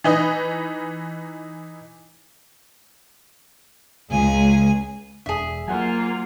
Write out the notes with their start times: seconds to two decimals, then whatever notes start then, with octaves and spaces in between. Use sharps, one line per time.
0.04 E3 D#4 B4 D#5
4.11 C#2 G#4 G#5
5.26 E1 D4 G#4 E5
5.68 F#3 A#3 F4 C5 F#5 G#5